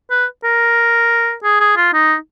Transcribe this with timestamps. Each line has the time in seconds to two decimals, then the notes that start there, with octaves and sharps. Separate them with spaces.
0.10 B4
0.44 A#4
1.43 G#4
1.60 G#4
1.76 F4
1.93 D#4